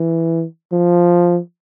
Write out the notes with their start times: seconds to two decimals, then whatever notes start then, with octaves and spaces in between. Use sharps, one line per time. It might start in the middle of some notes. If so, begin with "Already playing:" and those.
Already playing: E3
0.72 F3